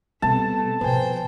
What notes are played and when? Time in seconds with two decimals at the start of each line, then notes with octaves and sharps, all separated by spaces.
0.22 B2 G3 A3 B3 C4 A5
0.81 B2 F3 B4 C5 G5 G#5